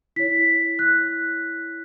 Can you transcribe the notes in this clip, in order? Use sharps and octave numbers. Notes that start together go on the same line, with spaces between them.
E4 C#5 B6
F#6